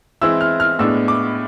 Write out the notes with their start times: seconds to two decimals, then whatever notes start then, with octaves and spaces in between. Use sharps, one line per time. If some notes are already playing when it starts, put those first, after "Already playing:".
0.22 E3 G#3 C4 E4 E6
0.41 F6
0.60 F6
0.79 A2 G#3 B3 D4 E6
1.08 D6